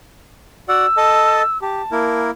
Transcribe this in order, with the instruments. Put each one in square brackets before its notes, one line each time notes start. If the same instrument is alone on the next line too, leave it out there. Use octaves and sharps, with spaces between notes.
[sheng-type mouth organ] F#4 D5 F#5 [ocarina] E6
[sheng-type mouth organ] A4 D#5 A5
[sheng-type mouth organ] G4 [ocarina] A5
[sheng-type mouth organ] A#3 E4 A#4